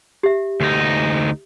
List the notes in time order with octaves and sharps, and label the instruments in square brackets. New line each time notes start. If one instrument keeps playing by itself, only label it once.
[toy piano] G4 E5
[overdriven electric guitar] D2 D#4